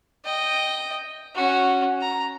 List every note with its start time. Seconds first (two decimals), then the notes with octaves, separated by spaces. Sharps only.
0.25 D#5 G5
1.35 C#4 F#4
2.01 A#5